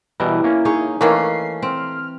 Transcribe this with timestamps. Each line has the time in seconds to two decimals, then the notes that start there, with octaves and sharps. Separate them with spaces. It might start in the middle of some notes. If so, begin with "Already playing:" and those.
0.20 B2 E3 G3 E4 A#4
0.44 A#3 C#4
0.65 D#4 G#4 C#5
1.01 D#3 E3 A3 A#3 C#4 C7
1.62 C4 F6